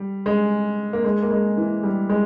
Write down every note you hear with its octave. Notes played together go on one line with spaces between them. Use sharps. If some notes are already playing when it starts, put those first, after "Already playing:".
Already playing: G3
G#3
A#3
G#3
A#3
G#3
E3
G3
G#3